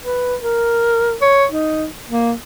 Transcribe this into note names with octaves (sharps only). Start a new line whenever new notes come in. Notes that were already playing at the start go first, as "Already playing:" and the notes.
B4
A#4
C#5
D#4
A#3